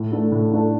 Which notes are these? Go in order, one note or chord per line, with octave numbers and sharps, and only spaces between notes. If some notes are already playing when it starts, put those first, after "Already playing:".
Already playing: A2
A3 D4 A4
A2
A3 D4 A4